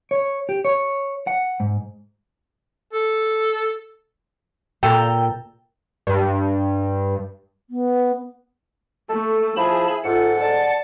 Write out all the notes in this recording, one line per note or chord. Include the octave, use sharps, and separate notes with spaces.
C#5
G4
C#5
F#5
G#2
A4
A#2 A4 G5 A#5
G2
B3
A3 A4
F3 E4 G#4 E5 A5 B5
G#2 F4 A4 F#5
D5 A5